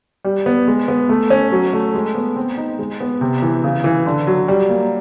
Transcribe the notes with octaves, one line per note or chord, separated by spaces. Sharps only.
G3
B3
G#3
B3
A3
C#4
F#3
A3
G#3
B3
C4
D#4
G#3
B3
C3
E3
C#3
E3
D3
F#3
G3
A#3